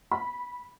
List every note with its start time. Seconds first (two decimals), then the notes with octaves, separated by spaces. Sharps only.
0.11 B5